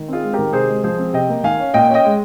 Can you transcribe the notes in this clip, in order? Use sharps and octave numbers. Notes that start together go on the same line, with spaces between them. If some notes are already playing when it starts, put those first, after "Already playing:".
Already playing: D#3
C4 F4 G#4
G#3
G4 A#4
D#3
C3 G#4 C5
G#3
F3 G#4 C5
C4
C3 D#5 G5
A#3
D#3 F5 G#5
C#4
A#2 D#5 G5
C#4
D#5 G5
G#3